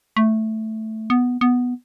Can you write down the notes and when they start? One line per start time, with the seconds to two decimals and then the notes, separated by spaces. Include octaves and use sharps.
0.17 A3
1.10 B3
1.41 B3